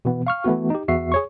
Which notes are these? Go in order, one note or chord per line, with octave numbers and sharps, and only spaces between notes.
B2 E3 B3
F5 C#6 F6
E3 A3 B3 F#4
D#4 G4
E2 F#4 E5 C7
G#4 C#5 C#6